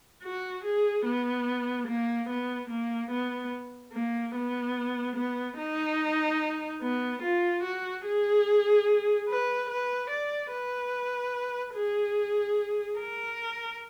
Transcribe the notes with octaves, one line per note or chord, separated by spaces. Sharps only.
F#4
G#4
B3
A#3
B3
A#3
B3
A#3
B3
B3
D#4
B3
F4
F#4
G#4
B4
B4
D5
B4
G#4
A#4